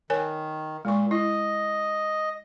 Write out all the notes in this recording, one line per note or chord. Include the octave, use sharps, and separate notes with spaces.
D#3 A#4 C#5 G#5
A#2 G#3 C#6
E4 D#5